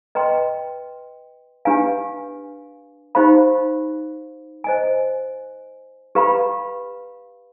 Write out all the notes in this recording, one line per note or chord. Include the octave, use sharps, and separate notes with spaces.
B4 D#5 G5 C6
D4 G4 B4 F5 G#5
D#4 G4 C5 F5 B5
C5 D#5 G#5
G4 B4 F5 B5